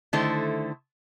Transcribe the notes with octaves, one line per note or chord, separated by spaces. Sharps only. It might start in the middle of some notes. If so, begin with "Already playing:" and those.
D3 D#3 A3 E4 A4 C5